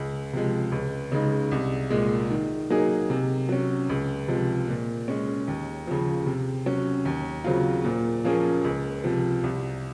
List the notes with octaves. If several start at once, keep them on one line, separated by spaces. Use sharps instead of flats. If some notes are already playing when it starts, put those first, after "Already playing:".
Already playing: C#2
C3 F3 G#3
C#2
C#3 G#3 D#4
C2
A#2 G#3
D#3
F#3 A#3 D#4 G#4
C3
F#3 C#4
C#2
C3 F3 G#3
A#2
G#3 C#4
D#2
C#3 F3
C3
F#3 C#4
D#2
C#3 F#3 C4 F4
A#2
F3 A#3 C#4 G#4
C#2
C3 F3
C2